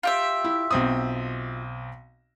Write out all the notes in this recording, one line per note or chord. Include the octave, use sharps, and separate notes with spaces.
F4 G4 E5
E4
B1 C4 D#6